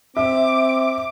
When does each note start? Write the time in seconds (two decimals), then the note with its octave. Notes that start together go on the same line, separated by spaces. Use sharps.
0.17 C4 E5 D6